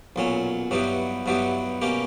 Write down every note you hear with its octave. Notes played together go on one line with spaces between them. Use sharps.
B1 A#2 F#3 C#4
G2 F#3 B3 E4 G4
G2 F#3 B3 E4 G4
B2 A#3 C#4 G4